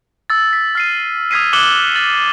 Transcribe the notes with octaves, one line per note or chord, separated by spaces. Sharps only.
E6 A6
B6
F6 C7 D#7
D#6 F6 G#6 B6 C7 D#7
D6 F#6 C#7 E7 F#7 G7
A6 F#7